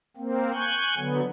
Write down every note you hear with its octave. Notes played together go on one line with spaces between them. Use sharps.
A#3 C4
G#5 C#6 F#6 G6
D3 F#3 B3